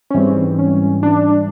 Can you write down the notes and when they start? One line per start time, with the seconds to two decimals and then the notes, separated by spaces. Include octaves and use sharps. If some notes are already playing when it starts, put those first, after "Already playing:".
0.10 C#4
0.14 G#2 E3 G3 C4
0.59 C#4
1.03 D4